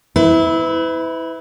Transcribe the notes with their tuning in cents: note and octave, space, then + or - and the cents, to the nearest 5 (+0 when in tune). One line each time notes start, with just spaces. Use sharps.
E4 -20 B4 +35